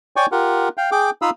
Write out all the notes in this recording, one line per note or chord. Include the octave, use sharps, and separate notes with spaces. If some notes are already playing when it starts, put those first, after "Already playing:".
C#5 D5 G5 G#5 C#6 D6
F4 G4 A#4 F#5
F5 G5
G#4 G5 D6
D#4 F4 F5 B5 D#6 E6